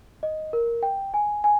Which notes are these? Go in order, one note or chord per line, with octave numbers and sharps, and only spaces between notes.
D#5
A#4
G5
G#5
G#5